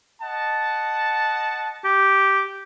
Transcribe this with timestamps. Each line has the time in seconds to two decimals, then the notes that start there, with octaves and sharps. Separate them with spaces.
0.22 D#5 F#5 A5
1.85 G4